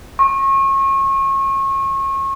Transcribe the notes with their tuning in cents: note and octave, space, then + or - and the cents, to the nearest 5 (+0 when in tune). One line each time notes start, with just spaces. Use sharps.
C#6 -30